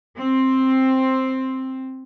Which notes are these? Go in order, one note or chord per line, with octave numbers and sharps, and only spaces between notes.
C4